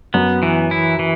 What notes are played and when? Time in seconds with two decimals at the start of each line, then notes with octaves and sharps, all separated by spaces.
0.14 F#2 B3
0.43 E3
0.71 E4
0.99 E3